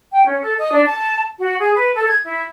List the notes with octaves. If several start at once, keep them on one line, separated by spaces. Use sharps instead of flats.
G5
C#4
A4
D#5
D4
A5
F#4
G#4
B4
A4
G#6
E4